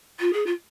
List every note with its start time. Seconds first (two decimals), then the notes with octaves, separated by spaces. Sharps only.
0.19 F4
0.33 G#4
0.46 F4